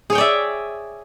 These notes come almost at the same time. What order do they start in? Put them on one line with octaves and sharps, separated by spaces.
G#4 C#5 G5 D5 E5